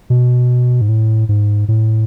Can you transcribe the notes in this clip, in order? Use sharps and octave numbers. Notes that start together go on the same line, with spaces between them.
B2
G#2
A2
G#2
A2